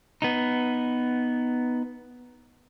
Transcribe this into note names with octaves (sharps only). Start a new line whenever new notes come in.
B3 D#4